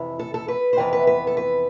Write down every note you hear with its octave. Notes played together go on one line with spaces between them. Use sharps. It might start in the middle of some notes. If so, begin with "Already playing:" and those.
Already playing: F2 C3 E3
A4
A4
B4
C5
F2 C3 E3 B3 B4
B4
B4
A4
B4